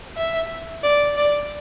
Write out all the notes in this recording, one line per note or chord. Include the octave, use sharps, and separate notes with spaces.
E5
D5
D5